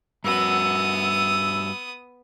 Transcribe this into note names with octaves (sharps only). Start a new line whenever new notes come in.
G2 B3 F#4 D#6 E6